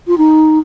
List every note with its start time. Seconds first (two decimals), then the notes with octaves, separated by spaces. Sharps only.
0.07 F4
0.18 D#4